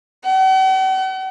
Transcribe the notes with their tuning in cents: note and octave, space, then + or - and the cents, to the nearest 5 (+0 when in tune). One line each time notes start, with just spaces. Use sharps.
F#5 +45